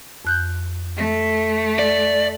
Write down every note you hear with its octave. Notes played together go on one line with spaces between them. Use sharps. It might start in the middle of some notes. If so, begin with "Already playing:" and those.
F2 F#6 G6
A3
D5